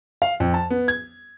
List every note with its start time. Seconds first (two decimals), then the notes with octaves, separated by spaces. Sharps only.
0.22 F5
0.40 F2
0.54 A5
0.70 B3
0.88 G#6